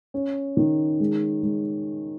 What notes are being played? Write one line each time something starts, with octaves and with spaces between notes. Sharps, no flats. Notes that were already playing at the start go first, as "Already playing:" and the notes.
C#4
D#3
G#3
G#3